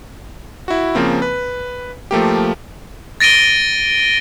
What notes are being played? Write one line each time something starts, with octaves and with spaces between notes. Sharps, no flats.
E4 F#4
C#3 F3 A#3 C4
B4
F3 A3 A#3 G4
A6 A#6 D7 D#7 G7